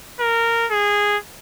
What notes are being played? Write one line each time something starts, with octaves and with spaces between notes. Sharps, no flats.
A#4
G#4